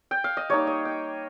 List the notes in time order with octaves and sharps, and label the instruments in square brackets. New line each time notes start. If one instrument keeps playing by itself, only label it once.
[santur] G5
F5
D#5
G3 A#3 D#4 C#5
D#5
G5